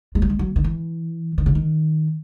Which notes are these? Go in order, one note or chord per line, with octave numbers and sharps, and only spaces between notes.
G#3
F#3
G#3
F#3
D#3
E3
D#3
C#3
D#3